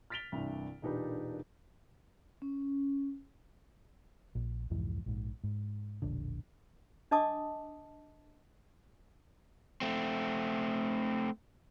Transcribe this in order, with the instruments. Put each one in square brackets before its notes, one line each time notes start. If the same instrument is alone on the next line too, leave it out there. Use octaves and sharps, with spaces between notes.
[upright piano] F6 A6 B6 D7 F7 G7
C2 G2 E3
E1 A#2 D4 D#4 G4 B4
[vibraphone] C#4
[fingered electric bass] A#1
C2 F2 G#2 E3
A#1 G#2
G#2
E1 A#1 D3
[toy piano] D4 D#5 A5 D6 D#6
[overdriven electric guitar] A3 C4